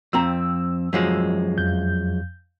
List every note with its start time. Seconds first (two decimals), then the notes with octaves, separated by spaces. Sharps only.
0.13 F2 C4 A#5 E6
0.93 F#2 F3 G#3
1.58 F2 G6